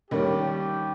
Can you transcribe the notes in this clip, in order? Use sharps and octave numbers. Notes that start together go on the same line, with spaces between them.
D#2 D#3 G3 A#3 C#4 G4